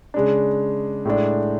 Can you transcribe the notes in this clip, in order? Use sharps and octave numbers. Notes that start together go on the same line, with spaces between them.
C#3 G#3 D4
A2 G#3 D4